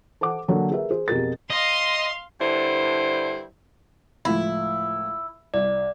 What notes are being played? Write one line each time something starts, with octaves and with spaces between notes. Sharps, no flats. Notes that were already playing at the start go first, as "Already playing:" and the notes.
A4 C5 F#5 D6
D3 F#3 A#3 A4 C#5
G#4 A#4 B4 E5
G#4 C5
F2 B2 G4 G#4 A#4 A6
D#5 F5 C6
G2 D3 E4 C5
C#2 A2 F3 E4
C2 D5